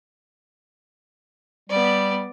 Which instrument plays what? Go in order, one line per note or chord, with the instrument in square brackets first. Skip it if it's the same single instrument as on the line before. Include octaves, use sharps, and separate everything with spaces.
[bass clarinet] G3 [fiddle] B3 D5